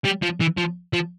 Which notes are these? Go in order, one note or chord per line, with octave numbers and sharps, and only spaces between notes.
G3
F3
E3
F3
F3